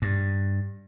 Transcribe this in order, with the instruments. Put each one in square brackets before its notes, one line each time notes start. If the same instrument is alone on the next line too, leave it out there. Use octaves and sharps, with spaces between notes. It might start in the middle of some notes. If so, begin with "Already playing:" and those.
[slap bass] G2